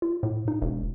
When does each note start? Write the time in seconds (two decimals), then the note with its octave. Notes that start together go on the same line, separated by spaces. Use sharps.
0.02 F4
0.23 A2
0.48 D#4
0.62 E1